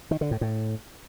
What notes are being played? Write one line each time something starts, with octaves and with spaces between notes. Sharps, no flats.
D#3
D3
A2
A2